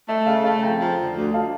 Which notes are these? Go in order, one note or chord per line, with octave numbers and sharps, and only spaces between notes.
A3 E5
C#3 F5
A3 F5 A5
F2 G5 A#5
F3
D3
D2
F5 A5